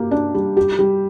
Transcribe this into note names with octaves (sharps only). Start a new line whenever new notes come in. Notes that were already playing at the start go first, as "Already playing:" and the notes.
Already playing: A#3 G4
D4
G3
G4
G3